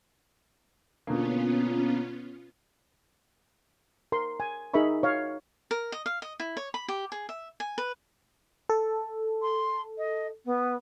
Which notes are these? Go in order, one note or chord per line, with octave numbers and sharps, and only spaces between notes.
B2 D3 A#3 B3 C#4 F4
A#4 C6
G#5
D#4 G#4 A#4 E5 B5 C#6
C#5 F5
A#4
D#5
F5
D#5
E4
C#5
B5
G4
G#4
E5
G#5
B4
A4
C6
D#5
B3